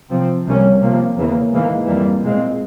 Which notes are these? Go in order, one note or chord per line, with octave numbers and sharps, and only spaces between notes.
C3 F3 C4
C2 C3 G3 A#3 C#4
C3 F3 A#3
E2 C#3 E3 A#3
G#2 E3 A#3
F2 E3 G3 A#3
A#2 G#3 C4